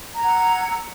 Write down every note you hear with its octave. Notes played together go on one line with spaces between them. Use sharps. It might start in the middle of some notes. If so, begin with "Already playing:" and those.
F#5 A#5 E6 G#6